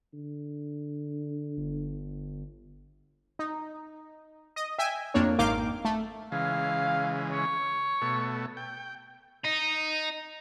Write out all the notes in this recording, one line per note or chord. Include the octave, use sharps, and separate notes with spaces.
D3
G1
D#4
D#5
E5 G5 G#5
F2 A#3 D4 C#5
G#1 D#3 A#3 F5 D6 G6
A3
C#3 E3 G#3 F5
C#5
B2 A3
G5
D#4